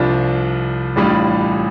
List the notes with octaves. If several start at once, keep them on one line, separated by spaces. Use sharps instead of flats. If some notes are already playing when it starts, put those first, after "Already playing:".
Already playing: C2 C3 F3 D4 F4
A1 A2 G3 D4 F4